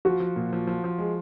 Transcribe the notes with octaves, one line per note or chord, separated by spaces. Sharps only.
F3 F#4
F3
A#2
F3
F3
F3
G#3